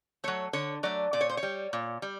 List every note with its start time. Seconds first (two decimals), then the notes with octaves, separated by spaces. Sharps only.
0.24 F#3 A3 C#5
0.53 D3 C#5
0.83 F#3 A3 D5
1.13 A#2 D5
1.21 C#5
1.29 C5
1.37 C#5
1.43 G3
1.73 A#2
2.02 G3